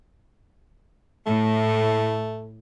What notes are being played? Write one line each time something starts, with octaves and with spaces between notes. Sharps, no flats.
A2 A3